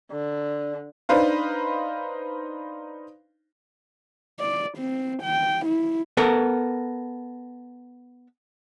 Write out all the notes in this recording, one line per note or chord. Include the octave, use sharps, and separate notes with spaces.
D3
D4 D#4 B4 C5 F5
D5
C4
G5
E4
B3 A4 A#4